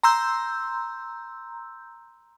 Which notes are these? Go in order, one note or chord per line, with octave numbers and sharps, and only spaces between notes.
A#5 C6 E6 G6